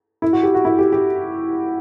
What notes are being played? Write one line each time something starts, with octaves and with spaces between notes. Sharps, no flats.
E4
F#4
G4
F#4
E4
G4
G4